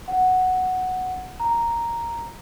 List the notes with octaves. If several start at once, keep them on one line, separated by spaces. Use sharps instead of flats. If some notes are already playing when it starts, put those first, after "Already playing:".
F#5
A#5